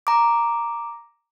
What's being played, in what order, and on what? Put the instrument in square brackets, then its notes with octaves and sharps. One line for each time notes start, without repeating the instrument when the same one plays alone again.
[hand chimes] A#5 D6